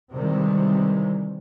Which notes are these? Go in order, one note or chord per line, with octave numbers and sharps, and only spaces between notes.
C3 D#3 E3 G3 G#3